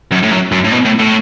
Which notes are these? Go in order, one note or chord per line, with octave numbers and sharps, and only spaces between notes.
F#2
A2
F#2
F#2
A2
B2
A2
A2